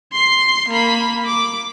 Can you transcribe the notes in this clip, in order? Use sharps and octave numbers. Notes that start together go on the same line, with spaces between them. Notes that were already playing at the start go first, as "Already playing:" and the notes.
C6 C7
A#3 B5
D6